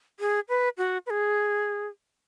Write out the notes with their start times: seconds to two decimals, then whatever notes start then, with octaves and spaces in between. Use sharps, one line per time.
0.20 G#4
0.49 B4
0.78 F#4
1.06 B4
1.10 G#4